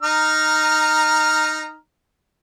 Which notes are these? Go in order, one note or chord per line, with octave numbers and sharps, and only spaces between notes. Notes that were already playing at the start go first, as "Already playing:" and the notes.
D#4 A#5 F6